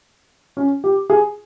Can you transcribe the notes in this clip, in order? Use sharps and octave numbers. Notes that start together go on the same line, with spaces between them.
C#4
G4
G#4